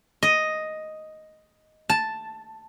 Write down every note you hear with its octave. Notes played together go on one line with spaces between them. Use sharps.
D#5
A5